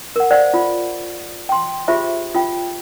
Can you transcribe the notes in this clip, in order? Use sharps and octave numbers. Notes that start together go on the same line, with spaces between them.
A#4 F#5
C5 D5 F5 F#5
F4
G5 C6
F4 G4 G#4 C5 E5
F4 G5